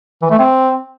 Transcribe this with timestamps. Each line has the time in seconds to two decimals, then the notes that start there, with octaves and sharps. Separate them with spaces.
0.22 E3
0.30 A3
0.39 C4